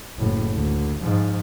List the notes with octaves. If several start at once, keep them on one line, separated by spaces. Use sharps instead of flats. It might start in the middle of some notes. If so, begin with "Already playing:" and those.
F#1 A2
D2
G#2 F3